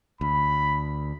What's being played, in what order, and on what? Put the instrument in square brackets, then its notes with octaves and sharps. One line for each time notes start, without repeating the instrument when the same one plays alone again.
[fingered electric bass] D2 [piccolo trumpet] B5